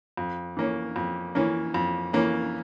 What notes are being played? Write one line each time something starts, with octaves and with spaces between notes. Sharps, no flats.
F2
E3 A#3 C#4
F2
E3 A#3 C#4
F2
E3 A#3 C#4